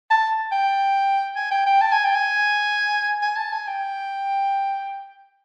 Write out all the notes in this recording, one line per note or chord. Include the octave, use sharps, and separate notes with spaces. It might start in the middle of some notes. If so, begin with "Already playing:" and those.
A5
G5
G#5
G5
G5
A5
G#5
G5
G#5
G#5
A5
G#5
G5